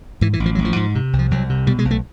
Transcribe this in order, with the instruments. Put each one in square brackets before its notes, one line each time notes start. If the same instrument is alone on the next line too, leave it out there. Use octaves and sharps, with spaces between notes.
[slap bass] G#2 E3
E3
A1
F3
A1 F#3
F3
G#2
C3
C2
F3
C2 F#3
C3
B2 G3
G#3
B1
A3